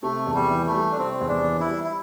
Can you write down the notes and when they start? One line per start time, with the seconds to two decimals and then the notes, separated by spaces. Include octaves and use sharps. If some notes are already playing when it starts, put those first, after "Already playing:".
0.03 C3 A3
0.27 E2
0.34 G3
0.50 E3
0.66 A3
0.74 G3
0.91 D4
0.97 C3 C4
1.21 E2
1.29 D4
1.44 E3
1.60 E4
1.68 G3
1.84 E4